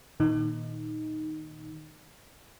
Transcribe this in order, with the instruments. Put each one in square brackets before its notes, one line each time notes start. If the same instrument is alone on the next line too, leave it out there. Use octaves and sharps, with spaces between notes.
[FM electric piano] A#2 D#3 D#4